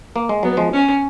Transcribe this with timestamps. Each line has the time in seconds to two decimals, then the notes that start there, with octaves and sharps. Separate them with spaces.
0.16 A#3
0.29 G#3
0.43 F#3 B3
0.57 F3 G#3
0.73 C#4